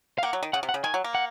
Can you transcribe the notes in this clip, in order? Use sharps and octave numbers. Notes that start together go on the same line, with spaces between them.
F5
A#3 F#5
F#3
D#3
C#3 F#5
C3
F#5
C#3
D#3 G#5
F#3
A#3
F#5